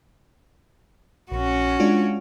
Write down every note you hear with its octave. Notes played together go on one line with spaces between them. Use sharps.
A#1 C#4 F#4
G#3 D4 F4